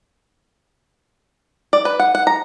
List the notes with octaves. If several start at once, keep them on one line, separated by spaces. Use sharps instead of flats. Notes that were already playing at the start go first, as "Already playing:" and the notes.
D5
B4
F#5
F#5
A#5